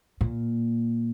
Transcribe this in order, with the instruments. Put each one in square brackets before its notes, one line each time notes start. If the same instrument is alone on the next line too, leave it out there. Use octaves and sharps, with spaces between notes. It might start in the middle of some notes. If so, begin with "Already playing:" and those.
[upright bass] A#2